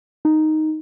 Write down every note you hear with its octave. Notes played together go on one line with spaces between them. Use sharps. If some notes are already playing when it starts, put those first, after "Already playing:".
D#4